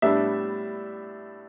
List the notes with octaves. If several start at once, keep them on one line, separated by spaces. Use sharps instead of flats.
A2 G3 B3 D4 E5